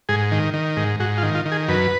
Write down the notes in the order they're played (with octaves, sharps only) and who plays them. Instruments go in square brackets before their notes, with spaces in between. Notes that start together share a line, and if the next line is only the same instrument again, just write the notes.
[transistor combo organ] G#2 G#4
D#3
D#3
G#2
G#2 F#4
F4
D#3
F4
D#3
G#4
F#2 B4